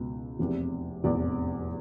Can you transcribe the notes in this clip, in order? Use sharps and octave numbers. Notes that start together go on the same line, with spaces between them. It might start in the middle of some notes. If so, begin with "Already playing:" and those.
Already playing: C#2 B2
F1 E2 C3
F1 E2 C3 D5